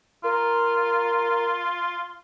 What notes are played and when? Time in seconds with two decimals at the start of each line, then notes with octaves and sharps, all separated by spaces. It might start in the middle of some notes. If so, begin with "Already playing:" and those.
0.24 F4 A#4